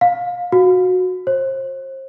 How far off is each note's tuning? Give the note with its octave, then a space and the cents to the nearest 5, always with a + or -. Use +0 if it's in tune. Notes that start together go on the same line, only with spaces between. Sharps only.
F5 +25
F#4 -10
C5 +35